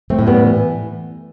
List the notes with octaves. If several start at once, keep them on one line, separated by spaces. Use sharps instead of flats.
A3 C4
A2
G3 B3
E3